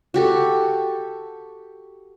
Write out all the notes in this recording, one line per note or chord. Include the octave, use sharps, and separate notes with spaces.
F#4 G4 A4